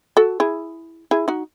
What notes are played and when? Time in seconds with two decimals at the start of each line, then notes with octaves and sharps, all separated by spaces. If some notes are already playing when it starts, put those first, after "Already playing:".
0.17 F#4 A4
0.40 E4 G#4
1.11 E4 G#4
1.28 D#4 F#4